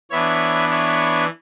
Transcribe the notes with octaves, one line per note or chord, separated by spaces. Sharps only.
E3 B3 D4 C#5 E5
C#5 E5